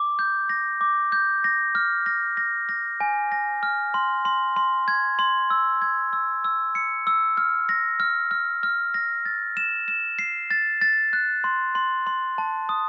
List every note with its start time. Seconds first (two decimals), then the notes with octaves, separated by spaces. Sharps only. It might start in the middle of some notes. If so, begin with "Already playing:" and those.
Already playing: D6
0.19 G6
0.49 A#6
0.81 D6
1.12 G6
1.44 A#6
1.75 F6
2.06 A#6
2.37 A#6
2.69 A#6
3.00 G#5
3.32 A#6
3.63 F6
3.94 C6
4.25 C6
4.56 C6
4.88 G#6
5.19 C6
5.50 E6
5.82 G#6
6.13 E6
6.44 E6
6.75 C#7
7.07 E6
7.37 F6
7.69 A#6
8.00 F6
8.31 F6
8.63 F6
8.94 A#6
9.25 A6
9.57 E7
9.88 E7
10.19 C7
10.51 A6
10.81 A6
11.13 F#6
11.44 C6
11.75 C6
12.07 C6
12.38 A5
12.69 D#6